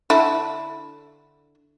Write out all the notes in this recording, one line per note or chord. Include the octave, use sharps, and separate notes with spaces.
D3 E4